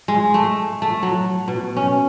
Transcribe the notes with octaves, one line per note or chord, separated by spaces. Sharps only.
G#3
A3
A3
F#3
B2
C#4